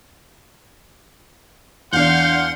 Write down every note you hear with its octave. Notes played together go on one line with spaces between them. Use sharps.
E2 D4 F5 F#5 C6 G6